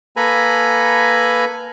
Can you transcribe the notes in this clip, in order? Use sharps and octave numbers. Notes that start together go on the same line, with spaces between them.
A#3 A4 B4 G#5 A#5 B5